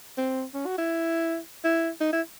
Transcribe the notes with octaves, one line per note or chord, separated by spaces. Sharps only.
C4
C#4
F#4
E4
E4
D#4
E4